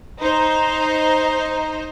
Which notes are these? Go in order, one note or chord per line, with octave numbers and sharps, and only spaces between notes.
D#4 C5